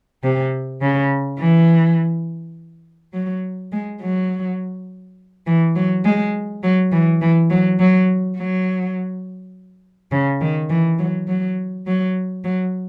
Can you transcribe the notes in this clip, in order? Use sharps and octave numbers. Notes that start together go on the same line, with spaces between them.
C3
C#3
E3
F#3
G#3
F#3
E3
F#3
G#3
F#3
E3
E3
F#3
F#3
F#3
C#3
D#3
E3
F#3
F#3
F#3
F#3